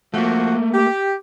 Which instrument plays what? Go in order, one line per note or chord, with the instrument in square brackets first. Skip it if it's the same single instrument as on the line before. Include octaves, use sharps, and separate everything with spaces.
[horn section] F3 F#4 [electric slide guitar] A3 A#3
[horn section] G4